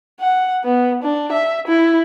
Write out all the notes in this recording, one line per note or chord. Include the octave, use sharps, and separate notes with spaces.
F#5
B3
D4
E5
E4